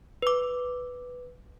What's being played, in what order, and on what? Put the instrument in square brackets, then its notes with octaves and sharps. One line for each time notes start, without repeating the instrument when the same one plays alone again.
[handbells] B4 D6